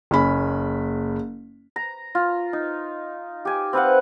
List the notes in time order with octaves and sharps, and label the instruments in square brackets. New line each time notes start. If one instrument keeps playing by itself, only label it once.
[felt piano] F#1 C#4 B5
[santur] A#5
F4
D#4
G4 G#5
C4 B4 F5 F#5